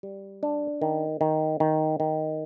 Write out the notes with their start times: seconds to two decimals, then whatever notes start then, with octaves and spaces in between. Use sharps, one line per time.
0.03 G3
0.43 D4
0.82 D#3
1.21 D#3
1.60 D#3
2.00 D#3